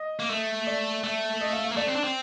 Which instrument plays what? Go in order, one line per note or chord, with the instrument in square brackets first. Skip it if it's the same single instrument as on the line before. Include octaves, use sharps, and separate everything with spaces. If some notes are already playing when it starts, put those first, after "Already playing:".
Already playing: [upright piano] D#5
[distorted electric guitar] A#3
A3
[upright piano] D5
[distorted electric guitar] A3
[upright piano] D#5
F5
F5
[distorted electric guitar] A#3
[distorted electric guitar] A3 [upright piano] D5
[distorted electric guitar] C4
D4
C4